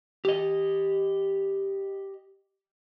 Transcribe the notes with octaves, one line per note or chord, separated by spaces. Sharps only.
G4 D#5